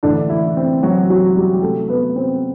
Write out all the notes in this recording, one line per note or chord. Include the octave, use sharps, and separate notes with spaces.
A2 D3 E3 A3 D4
E3 E4
C4
F#3 F#4
F#3 F#4
G3 G4
G4
C3 F#3 A3 A4
B3 B4
C4 C5